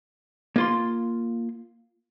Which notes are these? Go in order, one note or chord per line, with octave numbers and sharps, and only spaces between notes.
A#3 F4 C6